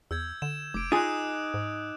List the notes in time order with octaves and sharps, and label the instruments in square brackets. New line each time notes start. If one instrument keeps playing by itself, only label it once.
[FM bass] E2 [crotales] E6 G6 G#6
[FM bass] D3 [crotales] E7
[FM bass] F1 [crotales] D6 D7
[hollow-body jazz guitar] D#4 G#4 [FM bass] F4 [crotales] D#6 F#6
[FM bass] G#2